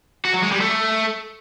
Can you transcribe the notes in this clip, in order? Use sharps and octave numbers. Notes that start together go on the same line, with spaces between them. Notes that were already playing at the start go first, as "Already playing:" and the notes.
F#4
F#3
G#3
G3
A3